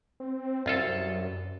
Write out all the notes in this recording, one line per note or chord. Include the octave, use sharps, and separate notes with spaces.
C4
C2 F#2 F4 A4